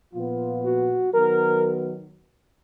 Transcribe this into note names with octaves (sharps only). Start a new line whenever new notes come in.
A#2 F3 B3 F4
F#4
D#3 F#3 B3 A#4